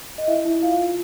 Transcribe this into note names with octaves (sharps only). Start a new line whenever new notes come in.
D#5
E4 E5
E4
F4 F5
F4